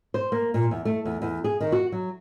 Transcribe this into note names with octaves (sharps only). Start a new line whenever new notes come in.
C5
A#3
A#2
E2
A3
E2
E2
G#4
D#3
F#4
F#3